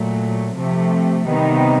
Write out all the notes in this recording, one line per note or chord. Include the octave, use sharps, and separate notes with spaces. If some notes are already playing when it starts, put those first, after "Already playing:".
Already playing: A#2 F#3 A3
C3 F3 A3
C3 D#3 G3 B3 D#4